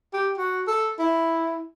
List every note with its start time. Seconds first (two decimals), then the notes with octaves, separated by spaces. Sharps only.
0.13 G4
0.37 F#4
0.67 A4
0.99 E4